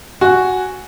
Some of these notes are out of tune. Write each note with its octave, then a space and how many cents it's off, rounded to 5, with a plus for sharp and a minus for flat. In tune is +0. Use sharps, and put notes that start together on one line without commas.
F#4 +0 G#5 +0